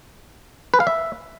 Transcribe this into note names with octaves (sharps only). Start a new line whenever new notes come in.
B4
F5
E5